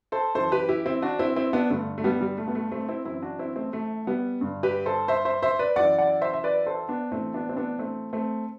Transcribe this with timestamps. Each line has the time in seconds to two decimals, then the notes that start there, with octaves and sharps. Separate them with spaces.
0.12 A4 C5
0.35 F#2 E3 A4 C5
0.52 G4 B4
0.69 E4 G4
0.86 C4 E4
1.02 D4 F#4
1.19 C4 E4
1.36 C4 E4
1.53 B3 D4
1.70 G2 D3 A3
1.98 A3
2.04 G3 B3
2.21 G3
2.38 A3
2.48 B3
2.55 A3
2.72 A3 C4
2.89 C4 E4
3.05 F#2 E3 C4 E4
3.22 D4 F#4
3.39 C4 E4
3.56 A3 C4
3.73 A3
4.07 G3 B3
4.41 G2 D3
4.63 G4 B4
4.86 A4 C5
5.08 C5 E5
5.25 C5 E5
5.42 C5 E5
5.59 B4 D5
5.76 F#2 E3 D5 F#5
5.99 D5 F#5
6.22 C5 E5
6.33 E5
6.44 B4 D5
6.66 A4 C5
6.89 B3 D4
7.11 A2 E3 A3 C4
7.34 B3 D4
7.49 C4
7.57 B3 D4
7.79 A3 C4
8.13 A3 C4